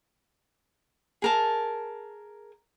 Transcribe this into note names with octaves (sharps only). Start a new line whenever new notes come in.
G#4 A#4 A5